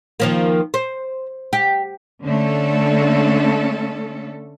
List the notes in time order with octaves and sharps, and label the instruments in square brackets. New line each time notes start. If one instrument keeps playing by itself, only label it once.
[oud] D#3 F3 A#3
C5
G4
[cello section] D3 A3 C#4 A4